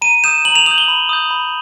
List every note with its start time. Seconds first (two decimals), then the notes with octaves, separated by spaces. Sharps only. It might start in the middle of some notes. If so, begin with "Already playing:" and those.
0.02 A#5 D#7
0.24 D#6 G6 E7
0.45 A#5 F#7
0.55 F7
0.66 D#6 G6 F#7
0.78 G7
0.88 B5
1.09 D#6 G6
1.31 B5